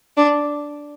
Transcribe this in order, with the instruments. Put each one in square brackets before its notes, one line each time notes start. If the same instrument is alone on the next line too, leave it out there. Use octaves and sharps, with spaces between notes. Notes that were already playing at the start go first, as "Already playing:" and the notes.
[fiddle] D4